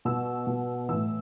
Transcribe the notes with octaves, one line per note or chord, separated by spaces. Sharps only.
B2 E6
B2
A2 E3 E6